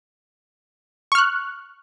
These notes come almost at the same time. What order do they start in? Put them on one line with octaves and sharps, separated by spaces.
C#6 F6 F#6